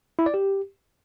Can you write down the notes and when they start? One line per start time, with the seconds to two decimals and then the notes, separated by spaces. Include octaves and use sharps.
0.19 E4
0.26 D5
0.34 G4